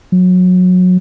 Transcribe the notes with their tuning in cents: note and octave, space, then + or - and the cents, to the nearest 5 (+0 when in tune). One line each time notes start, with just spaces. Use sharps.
F#3 -25